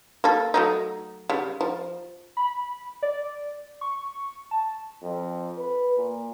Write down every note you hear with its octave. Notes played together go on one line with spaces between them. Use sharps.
A#3 A4
F#3 A3 D#4
C#3 G3
F3
B5
D5
C#6
A5
F2
B4
A#2